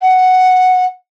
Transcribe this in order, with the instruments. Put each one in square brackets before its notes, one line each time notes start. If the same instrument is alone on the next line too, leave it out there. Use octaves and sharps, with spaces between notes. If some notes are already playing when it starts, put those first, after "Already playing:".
[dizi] F#5